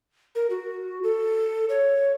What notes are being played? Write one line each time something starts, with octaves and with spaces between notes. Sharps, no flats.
A#4
F#4
A4
C#5